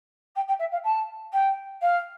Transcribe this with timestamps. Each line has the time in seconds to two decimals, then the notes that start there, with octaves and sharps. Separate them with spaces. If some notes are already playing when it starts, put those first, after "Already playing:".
0.35 G5
0.47 G5
0.59 E5
0.71 F5
0.83 A5
1.32 G5
1.81 F5